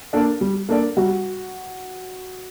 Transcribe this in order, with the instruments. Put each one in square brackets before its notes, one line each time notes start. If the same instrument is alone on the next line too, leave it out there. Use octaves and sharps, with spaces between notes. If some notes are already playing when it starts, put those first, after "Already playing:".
[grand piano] A#3 D4 A4 D5
G3
A#3 D4 A4 D5
[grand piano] G3 [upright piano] F#4